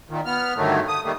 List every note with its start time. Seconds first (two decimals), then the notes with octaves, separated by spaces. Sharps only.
0.10 A#2 D#3
0.26 B3 F6
0.57 G2 D3 D#3 F#3 A3
0.88 D#6
1.04 D#3 G3 A3 A#3